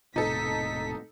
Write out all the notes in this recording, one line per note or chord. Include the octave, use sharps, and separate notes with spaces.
E1 A2 C3 D#4 A4 B6